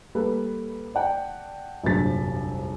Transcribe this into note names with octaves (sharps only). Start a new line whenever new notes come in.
G3 A#3 A4 B4
D5 F#5 G5 A5
F1 A#1 G2 F#3 A6 B6